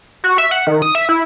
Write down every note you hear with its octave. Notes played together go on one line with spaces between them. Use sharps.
F#4
E5
F#5
D#3
D#6
E5
E4